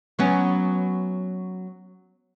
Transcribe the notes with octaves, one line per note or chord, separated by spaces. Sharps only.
F#3 B3 C#4